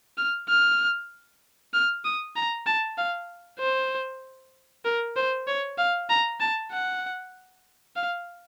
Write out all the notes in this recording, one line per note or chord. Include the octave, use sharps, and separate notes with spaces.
F6
F6
F6
D#6
A#5
A5
F5
C5
A#4
C5
C#5
F5
A#5
A5
F#5
F5